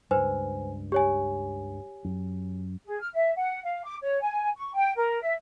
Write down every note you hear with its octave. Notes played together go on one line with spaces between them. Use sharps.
C#2 G2 B4 C5 G#5
G4 C#5 G#5
F#2
G#4
F6
E5
F#5
F5
D6
C#5
G#5
C#6
G5
A#4
E5